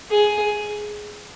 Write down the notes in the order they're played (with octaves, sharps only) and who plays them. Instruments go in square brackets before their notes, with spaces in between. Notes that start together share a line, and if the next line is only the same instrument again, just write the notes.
[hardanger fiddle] G#4